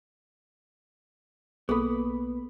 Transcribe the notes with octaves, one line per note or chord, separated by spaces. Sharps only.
B1 A#3 B3 G#4 A4 B5